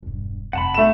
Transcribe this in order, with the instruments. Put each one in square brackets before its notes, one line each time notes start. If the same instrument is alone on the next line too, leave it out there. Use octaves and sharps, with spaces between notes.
[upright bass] E1 G2
[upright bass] F1 [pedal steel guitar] F#5 A5 B5
[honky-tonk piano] A3 E7